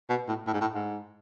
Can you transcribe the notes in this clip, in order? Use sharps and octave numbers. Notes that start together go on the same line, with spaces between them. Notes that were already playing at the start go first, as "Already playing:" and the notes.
B2
A2
A2
G#2
A2
G#2